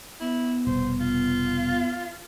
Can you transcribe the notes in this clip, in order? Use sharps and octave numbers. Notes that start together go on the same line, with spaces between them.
B3 E4
F1 B2 G3 C5
F4